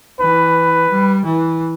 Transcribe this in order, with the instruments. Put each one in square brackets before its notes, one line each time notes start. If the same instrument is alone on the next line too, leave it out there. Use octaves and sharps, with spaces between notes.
[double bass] E3 [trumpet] B4
[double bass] G3
E3